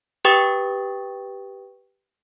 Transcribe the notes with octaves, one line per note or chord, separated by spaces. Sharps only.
G4 B4 G5 C#6 D#6 A6